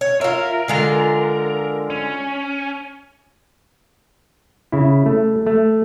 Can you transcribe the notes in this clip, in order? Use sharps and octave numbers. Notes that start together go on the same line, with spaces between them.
C#5
F4 A#4 E5
D3 G#3 F4
C#4
C#3 E4
A3
A3